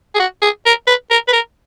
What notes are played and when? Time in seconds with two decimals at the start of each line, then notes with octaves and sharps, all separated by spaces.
0.15 G#4
0.20 F#4
0.42 G#4
0.66 A#4
0.87 B4
1.11 A#4
1.28 B4
1.33 A#4